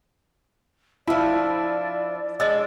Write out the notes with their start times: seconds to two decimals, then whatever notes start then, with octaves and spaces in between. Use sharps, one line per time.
1.08 F3 D4 E4 D5
2.40 G#3 D4 D#5 E6